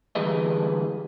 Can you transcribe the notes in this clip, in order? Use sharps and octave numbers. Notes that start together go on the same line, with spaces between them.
D2 E3 G3 G#3 B4 D#5